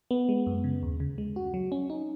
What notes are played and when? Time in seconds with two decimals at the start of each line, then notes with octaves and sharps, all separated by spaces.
0.11 B3
0.29 G#3
0.47 F#2
0.64 C#3
0.83 D#2
1.00 C#3
1.18 G#3
1.36 F#4
1.54 F#3
1.72 C#4
1.90 D#4